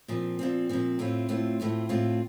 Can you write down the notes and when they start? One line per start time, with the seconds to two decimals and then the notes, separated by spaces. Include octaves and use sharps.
0.08 A#2 F3 C4
0.39 A#2 F3 C4
0.69 A#2 F3 C4
0.99 A2 A3 C4 F4
1.29 A2 A3 C4 F4
1.60 A2 A3 C4 F4
1.89 A2 A3 C4 F4